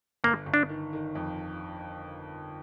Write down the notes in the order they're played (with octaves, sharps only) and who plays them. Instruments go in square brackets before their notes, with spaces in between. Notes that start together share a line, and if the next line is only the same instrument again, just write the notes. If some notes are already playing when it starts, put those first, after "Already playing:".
[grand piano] G1 [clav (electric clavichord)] A#3
[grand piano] G1
[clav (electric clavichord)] D4
[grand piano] D#3
D#3
F2